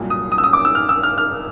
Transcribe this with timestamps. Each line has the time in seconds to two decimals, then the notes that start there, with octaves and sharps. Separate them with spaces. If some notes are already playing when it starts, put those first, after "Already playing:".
Already playing: C2 A#2 F#3
0.10 D#6
0.32 D#6
0.38 E6
0.44 D#6
0.53 D6
0.65 E6
0.75 F6
0.89 E6
1.03 F6
1.18 F6